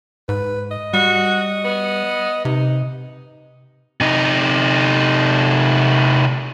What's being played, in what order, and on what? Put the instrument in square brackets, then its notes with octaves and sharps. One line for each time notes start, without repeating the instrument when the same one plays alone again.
[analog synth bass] G#2 [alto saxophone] B4
[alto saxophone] D#5
[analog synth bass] G3 [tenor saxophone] F#4
[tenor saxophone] B3
[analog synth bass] C3 [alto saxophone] D#4
[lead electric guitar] C3 D#4